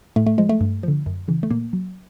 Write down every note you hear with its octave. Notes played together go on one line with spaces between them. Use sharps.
A2 A3
A3
F3 G#3
A3
G2
D3 F3
F#2
C#3 E3
A3
A#2 A#3
F#3